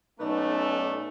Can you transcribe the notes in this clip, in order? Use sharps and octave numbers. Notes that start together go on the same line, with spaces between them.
B1 B2 A3 C#4 D#4 B4 D5